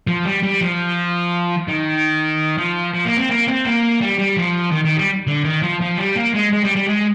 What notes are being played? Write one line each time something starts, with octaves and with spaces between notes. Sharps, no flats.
F3
G3
G3
F3
D#3
F3
F3
A#3
C4
A#3
C4
A#3
G3
G3
F3
D#3
D#3
G3
D3
D#3
F3
F3
G3
A#3
G#3
G#3
G3
G3
G#3